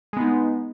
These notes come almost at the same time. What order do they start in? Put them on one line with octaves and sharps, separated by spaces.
G#3 B3 D#4